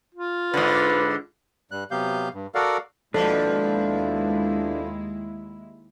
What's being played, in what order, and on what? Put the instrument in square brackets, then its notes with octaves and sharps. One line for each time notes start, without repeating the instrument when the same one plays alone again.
[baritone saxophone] F4
[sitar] G#2 D3 [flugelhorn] B4
[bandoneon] G2 G3 F#6
C3 F#3 B3 G4 F5 G6
G2
F#4 A4 A#4 D5 F5 F#5
[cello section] D#2 G#3 E4 [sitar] B2 F3 [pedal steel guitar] D4 B4 [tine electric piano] A4